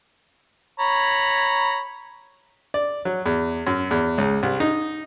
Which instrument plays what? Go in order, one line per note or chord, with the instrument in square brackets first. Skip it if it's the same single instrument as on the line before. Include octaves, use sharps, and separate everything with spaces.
[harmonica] C#5 A#5 B5
[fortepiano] D5
F#3
E2
F#2
E2
C#2
C2
D#4